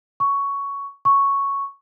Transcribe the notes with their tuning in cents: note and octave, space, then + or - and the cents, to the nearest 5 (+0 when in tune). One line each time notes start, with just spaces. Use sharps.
C#6 +10
C#6 +0